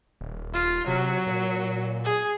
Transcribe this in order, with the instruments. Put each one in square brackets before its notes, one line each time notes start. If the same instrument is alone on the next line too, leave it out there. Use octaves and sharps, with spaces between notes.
[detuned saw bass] D#1
[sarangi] F4
[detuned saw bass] C3 [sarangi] F#3
[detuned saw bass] A#2
[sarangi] G#4